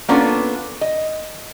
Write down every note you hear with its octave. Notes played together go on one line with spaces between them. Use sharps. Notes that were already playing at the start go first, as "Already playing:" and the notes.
A#3 B3 C#4 D4 F4 A4
D#5